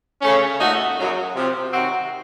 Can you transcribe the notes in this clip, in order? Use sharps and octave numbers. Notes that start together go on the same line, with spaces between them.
C#3 A3 C#4
A#2 A3 D#4 F#4
F#2 C#3 F#3
C3 F3 C4
C3 D#3 F#3 C4 F#4